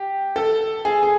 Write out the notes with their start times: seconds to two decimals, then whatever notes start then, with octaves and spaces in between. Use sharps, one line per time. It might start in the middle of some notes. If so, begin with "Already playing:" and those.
Already playing: G4
0.36 A4
0.85 G#4
1.03 G#4